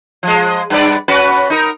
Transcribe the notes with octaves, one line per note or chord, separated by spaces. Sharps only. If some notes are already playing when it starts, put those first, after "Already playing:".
F3 G#3
G2 B4 D5
C#4 F#4 B4
D#4 A#4